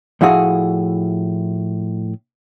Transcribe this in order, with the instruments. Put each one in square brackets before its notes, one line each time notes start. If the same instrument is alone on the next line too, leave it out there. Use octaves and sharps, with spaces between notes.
[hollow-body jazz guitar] A2 F3 E4 F#4 G#4